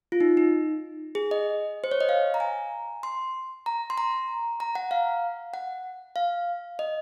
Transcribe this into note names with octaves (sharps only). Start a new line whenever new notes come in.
F4
D#4
D#4
G#4
D#5
C5
C#5
D#5
F5
A#5
G#5
C6
A#5
C6
A#5
A#5
F#5
F5
F#5
F5
D#5